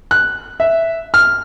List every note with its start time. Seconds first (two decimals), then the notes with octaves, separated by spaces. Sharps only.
0.11 F#6
0.60 E5
1.14 F6